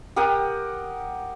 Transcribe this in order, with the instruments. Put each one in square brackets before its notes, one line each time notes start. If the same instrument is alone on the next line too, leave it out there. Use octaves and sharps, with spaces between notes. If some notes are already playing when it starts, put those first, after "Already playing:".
[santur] G4 A#4 F#5 D#6